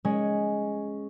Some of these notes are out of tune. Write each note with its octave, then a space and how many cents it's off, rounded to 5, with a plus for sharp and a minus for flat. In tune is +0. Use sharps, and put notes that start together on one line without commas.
G#3 +0 C#4 +0 C#5 +0